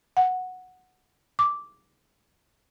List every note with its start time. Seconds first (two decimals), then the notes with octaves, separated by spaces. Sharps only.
0.17 F#5
1.39 D6